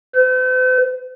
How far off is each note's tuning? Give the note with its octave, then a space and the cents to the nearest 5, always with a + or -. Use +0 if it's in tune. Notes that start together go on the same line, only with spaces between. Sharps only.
C5 -45